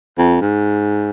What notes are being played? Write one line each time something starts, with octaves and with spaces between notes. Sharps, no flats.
F2
G#2